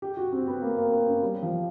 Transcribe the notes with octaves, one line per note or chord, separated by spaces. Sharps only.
G4
F#4
C4
B3
A#3
A#3
B3
C#4
G3
F3